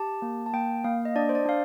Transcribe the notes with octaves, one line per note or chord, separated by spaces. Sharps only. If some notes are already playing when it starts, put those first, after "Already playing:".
Already playing: G4 A5
A#3
A5
A#3 G5
A#3 F5
D#5
D4 D5
C5
D5
D4 F5